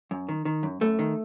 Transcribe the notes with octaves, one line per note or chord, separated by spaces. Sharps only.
F#2
D#3
D#3
F#2
F#2 A3
D#3